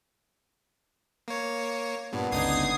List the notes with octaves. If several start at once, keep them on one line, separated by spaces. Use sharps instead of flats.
A#3 C#5
G2 A#2 B3 D4
G1 C#2 D#4 D#6 G#6 C7